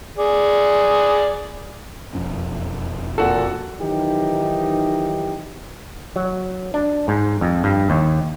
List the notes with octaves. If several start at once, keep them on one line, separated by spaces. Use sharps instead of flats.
G#4 D5
E1 F2 C#4
A#2 F#4 A4 F#5
D#3 E3 F#3 D#4 G4
F#3
D4
G#2
F2
G2
D#2